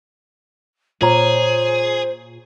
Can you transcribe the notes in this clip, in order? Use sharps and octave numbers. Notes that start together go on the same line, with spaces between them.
A#2 F4 G#4 C5 C#5 A#5